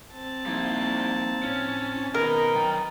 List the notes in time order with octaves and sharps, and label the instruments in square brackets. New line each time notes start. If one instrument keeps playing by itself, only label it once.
[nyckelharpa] C4 A5
[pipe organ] F3 A#3 D#4 [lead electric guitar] G3 E4
[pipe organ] A2 [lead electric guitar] C#4
[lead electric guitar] B2 [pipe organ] D#3 [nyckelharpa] D#4 B4 [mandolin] A#4
[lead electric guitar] F#3 G5